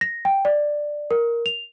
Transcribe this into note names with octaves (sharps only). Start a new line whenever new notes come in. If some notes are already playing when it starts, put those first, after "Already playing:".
A#6
G5
D5
A#4
F7